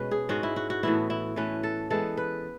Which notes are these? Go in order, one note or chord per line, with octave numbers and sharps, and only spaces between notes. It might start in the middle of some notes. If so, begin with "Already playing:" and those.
Already playing: B2 G#3 C#4 B4
G#4
G#2 G#3 C#4 F#4
E4
F#4
F#4
A2 E3 B3 E4
E4
E3 A3 C#4 B4
A4
E3 G#3 B3 A4
B4